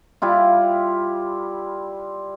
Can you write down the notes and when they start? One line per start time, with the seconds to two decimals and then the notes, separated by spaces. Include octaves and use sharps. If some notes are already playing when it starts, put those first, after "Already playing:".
0.22 G3 E4 F4